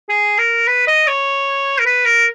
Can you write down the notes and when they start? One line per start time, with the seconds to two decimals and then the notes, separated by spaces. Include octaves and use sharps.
0.09 G#4
0.38 A#4
0.68 B4
0.87 D#5
1.07 C#5
1.79 A#4
1.86 B4
2.05 A#4